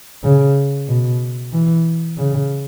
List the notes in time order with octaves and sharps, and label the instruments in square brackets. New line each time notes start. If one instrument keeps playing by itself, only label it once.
[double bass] C#3
B2
E3
C#3